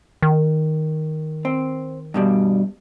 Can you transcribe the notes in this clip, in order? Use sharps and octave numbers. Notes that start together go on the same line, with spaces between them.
D#3
C4
G2 B2 G3